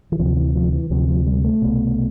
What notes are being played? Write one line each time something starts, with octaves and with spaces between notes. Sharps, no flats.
E3
D2 C3 F3
E3
F3
E3
D2 C3 F3
F3
G3
A3
C2 B2